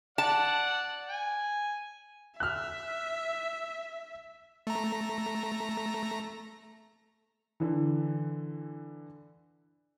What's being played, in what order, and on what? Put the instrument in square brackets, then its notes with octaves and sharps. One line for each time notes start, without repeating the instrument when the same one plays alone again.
[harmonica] D5 F#5 [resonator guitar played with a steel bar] A5
[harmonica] G#5
[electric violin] E5 [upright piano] F6 F#6
[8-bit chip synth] A3 A#5
[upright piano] D3 E3